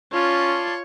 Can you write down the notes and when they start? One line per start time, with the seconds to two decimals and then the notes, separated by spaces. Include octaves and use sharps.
0.13 C#4 F4 C#5 D5 A5 C6